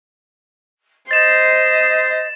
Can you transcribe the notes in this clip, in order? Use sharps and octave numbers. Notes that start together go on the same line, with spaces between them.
C5 D#5 A6 E7